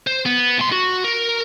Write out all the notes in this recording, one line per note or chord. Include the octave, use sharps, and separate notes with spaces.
C5
B3
A2 C6
F#4
A#4